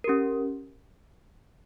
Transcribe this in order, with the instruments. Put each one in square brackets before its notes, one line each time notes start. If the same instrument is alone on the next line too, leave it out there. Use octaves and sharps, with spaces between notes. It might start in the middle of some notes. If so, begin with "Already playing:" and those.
[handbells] C#4 G4 A#4